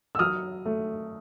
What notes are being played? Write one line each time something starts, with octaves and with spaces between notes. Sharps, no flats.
E6
F#3 D#6 F6
A3